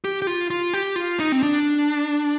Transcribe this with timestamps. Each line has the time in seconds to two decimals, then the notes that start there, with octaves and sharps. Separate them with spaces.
0.05 G4
0.22 G4
0.27 F4
0.50 F4
0.74 G4
0.96 F4
1.20 D#4
1.32 C4
1.43 D4